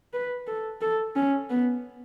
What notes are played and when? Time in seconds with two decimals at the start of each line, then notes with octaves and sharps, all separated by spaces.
0.13 B4
0.47 A4
0.81 A4
1.16 C#4
1.50 B3